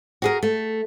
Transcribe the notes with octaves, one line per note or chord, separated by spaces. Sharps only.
F#4 G#4 A#4
A3